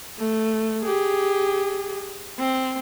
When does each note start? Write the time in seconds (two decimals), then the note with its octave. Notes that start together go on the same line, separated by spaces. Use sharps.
0.18 A3
0.83 G4 G#4
2.39 C4